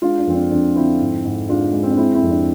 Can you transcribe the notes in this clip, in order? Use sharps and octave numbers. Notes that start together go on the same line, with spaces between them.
G#3 D4 F4
D4
F2 C4
D4
F2 D4
D3 C4 E4
G#2
G#2
G#3 D4 F4
G#3
C4
D4
G#3 C4 E4
C4 E4
F2
D4